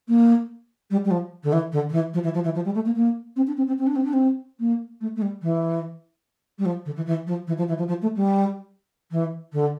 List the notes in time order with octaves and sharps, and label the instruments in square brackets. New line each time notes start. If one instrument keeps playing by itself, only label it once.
[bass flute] A#3
G3
G3
F3
D3
E3
D3
D3
E3
F3
E3
F3
E3
F3
G3
A3
A#3
A#3
C4
D4
C4
C4
C4
D4
C4
D4
C4
A#3
A3
A3
G3
E3
G3
F3
D3
E3
E3
F3
E3
F3
E3
F3
F3
A3
G3
E3
D3